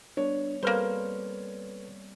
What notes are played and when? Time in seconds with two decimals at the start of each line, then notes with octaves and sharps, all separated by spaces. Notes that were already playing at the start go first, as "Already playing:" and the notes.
0.17 G3 B3 D4 C#5
0.63 G3 A#3 C4 A4 B4 C5 F6